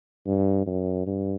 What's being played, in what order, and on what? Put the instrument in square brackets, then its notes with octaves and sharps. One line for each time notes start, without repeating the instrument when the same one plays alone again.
[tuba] G2
F#2
G2